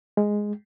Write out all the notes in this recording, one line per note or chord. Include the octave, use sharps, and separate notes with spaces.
G#3